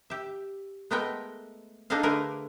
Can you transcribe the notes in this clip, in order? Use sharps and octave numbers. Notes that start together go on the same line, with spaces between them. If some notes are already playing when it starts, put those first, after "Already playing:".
G4 E5
G#3 A3 B3 A#4 D#5 G5
D4 D#4 G#4 A4 D#5 F5
D3 A3 G#4 A#4 B4